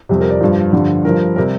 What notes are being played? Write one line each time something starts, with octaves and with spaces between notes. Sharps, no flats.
F2 C3 G3
A#4
D5
G2 F3
G2 D3 F3
G2 F3 A#4
A#4
C3 G3